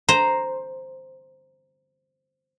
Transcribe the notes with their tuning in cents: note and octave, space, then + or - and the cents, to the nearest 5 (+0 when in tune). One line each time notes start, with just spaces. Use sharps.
C5 +0 A#5 +0